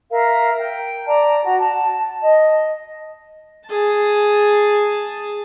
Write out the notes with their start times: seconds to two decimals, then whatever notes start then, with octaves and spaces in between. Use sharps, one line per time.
0.11 A#4 E5 F5
0.58 G5
1.06 D5 A5 A#5
1.44 F#4
1.61 A5
2.21 D#5
3.67 G#4 A5